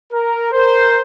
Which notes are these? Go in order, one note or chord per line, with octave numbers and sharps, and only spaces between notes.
A#4
A#4 C5